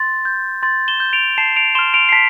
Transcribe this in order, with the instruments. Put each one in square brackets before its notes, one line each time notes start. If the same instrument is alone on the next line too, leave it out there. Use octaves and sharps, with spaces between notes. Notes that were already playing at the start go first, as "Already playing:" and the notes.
Already playing: [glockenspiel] C6 A6
G6
C6 A6
E7 G7
G6
D7 F7
A5 C7 E7
D7 F7
C6 F6 E7 G7
D7 F7
C7
A5 B6 D7